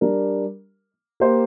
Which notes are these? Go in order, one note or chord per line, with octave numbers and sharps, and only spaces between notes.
G3 D4 A#4
A#3 G4 C5